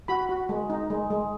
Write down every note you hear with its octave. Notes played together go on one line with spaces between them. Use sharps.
F#4 B5
F#4
G#3
D#4
G#3
G#3